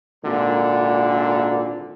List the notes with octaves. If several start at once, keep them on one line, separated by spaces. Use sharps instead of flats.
G#1 A#2 D3